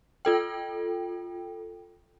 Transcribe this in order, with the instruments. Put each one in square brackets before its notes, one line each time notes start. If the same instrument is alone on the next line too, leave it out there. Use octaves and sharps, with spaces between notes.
[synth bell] F4 A4 G5